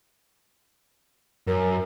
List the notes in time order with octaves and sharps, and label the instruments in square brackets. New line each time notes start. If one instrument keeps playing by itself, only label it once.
[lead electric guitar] F#2 [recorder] A#4